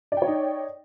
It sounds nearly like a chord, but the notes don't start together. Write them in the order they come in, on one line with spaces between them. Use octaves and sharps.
D5 G5 C#5 D#4